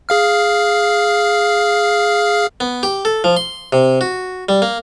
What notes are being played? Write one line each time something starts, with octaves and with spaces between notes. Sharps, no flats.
G#4 F5 F6
B3
G4
A4
F3
C6
C3
F#4
G3
A#3